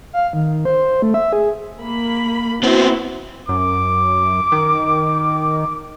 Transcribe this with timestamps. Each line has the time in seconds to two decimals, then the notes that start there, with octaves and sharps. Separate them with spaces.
0.13 F5
0.33 D#3
0.65 C5
1.02 A3
1.14 E5
1.33 G#4
1.81 A#3 B5
2.63 B3 C4 E4 F#4
3.49 F#2 D6
4.52 D#3